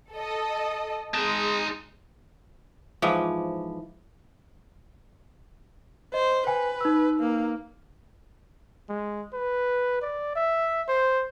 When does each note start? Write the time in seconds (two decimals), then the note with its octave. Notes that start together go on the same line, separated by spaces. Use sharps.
0.14 A4 D#5
1.14 G#3 D#4 A5
3.02 G#2 E3 F3
6.14 C5 D#5
6.47 B4 G5 G#5
6.81 D#4 E6
7.20 A#3
8.89 G#3
9.33 B4
10.02 D5
10.35 E5
10.88 C5